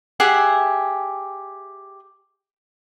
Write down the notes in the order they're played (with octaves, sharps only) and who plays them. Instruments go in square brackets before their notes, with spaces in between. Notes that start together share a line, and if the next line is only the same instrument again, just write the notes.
[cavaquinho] G4 G#4 E5 F#5